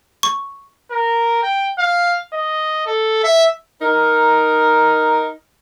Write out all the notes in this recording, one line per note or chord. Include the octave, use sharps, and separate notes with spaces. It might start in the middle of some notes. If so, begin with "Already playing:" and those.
C#6
A#4
G5
F5
D#5
A4
E5
D#4 A#4